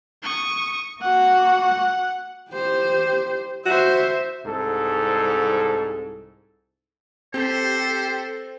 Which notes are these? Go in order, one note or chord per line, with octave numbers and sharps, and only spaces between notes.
C#6 D#6
A#3 F#4 F#5
G4 C5
F#4 C5 E5
C2 G#2 A4
C4 G4 A4 C5